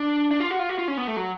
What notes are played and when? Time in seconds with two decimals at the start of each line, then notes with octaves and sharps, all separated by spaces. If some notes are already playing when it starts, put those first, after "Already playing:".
Already playing: D4
0.31 D4
0.40 F4
0.50 F#4
0.59 F4
0.69 F#4
0.79 F4
0.88 C#4
0.97 B3
1.07 A3
1.17 F#3